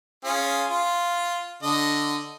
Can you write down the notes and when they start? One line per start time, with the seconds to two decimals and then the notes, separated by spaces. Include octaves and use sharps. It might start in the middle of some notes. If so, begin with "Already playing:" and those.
0.25 C#4 F4 G#4
0.70 F4
1.63 D3 D#5